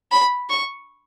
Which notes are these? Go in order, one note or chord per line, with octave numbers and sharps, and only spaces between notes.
B5
C#6